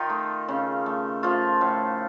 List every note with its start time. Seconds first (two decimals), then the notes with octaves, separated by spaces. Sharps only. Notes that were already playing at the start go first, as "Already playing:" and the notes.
Already playing: D#3 D#4 F4
0.10 A3
0.48 C#3
0.86 A3
1.23 F3 A3 F4
1.61 A2